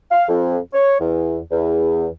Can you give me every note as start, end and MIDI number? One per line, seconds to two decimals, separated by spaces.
0.11 0.28 77
0.29 0.57 41
0.73 1.00 73
1.00 1.38 40
1.51 2.07 40